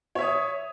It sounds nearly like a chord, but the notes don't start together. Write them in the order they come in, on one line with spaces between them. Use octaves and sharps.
C#5 E5 D#6